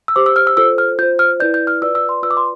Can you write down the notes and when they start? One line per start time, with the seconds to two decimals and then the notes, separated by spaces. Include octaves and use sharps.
0.08 E6
0.16 G4 C5 D6
0.26 E6
0.36 F6
0.47 E6
0.57 F4 A4 C5 E6
0.78 F6
0.99 F4 G6
1.03 C5
1.19 F6
1.40 E4 B4 D5 G6
1.54 G6
1.67 F6
1.82 F4 B4 D5 E6
1.95 E6
2.09 C6
2.23 F4 B4 D5 E6
2.31 D6
2.37 C6